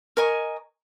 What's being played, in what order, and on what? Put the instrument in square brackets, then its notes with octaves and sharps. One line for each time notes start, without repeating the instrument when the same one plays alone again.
[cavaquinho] A#4 D#5 G#5 C#6